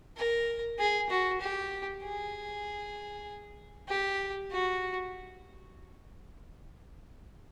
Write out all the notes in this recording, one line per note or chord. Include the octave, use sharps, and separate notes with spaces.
A#4
G#4
F#4
G4
G#4
G4
F#4